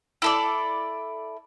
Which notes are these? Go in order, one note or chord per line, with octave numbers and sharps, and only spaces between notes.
E4 A4 D5